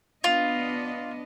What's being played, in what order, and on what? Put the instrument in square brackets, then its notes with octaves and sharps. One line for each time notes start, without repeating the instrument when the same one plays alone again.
[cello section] B3 D4 D#5 [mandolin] F4